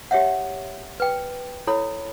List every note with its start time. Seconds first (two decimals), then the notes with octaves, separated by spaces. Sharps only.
0.11 G4 C#5 E5 F#5
1.00 B4 G5
1.67 E4 A4 C#5 B5